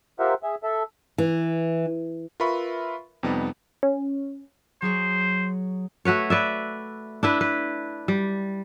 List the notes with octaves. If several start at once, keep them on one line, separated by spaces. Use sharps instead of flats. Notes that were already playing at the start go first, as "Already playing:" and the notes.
F4 G4 A#4 C5 E5 F#5
G#4 E5
A4 E5
E3
F4 A#4 B4 E5 B5 C#6
F2 C3 G3 B3 D#4
C#4
F#3 G#4 C5 C#5
A3 F#4 B4 C#5
B4 D5 E5
D4 E4 B4
B4
G3